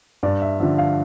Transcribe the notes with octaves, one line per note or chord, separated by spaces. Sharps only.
G2 D5
E5
D3 F3 E5
F5